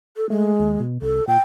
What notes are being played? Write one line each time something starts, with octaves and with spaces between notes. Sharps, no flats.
A4
G#3 A3
D#2
B2
C2 A4
A#2 G5